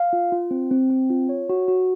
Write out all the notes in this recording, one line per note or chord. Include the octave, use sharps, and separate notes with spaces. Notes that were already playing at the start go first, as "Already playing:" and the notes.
Already playing: F5
F4
F4
C4
C4
C4
F4
C#5
F#4
F#4